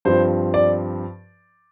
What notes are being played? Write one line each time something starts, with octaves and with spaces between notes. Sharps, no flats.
G2 F3 C4 C5
D5